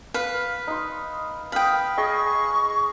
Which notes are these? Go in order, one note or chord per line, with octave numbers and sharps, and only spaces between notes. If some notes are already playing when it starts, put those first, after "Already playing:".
B4 F5
D#4 C6
B4 F5 G5 D#6
G#4 D#5 C#6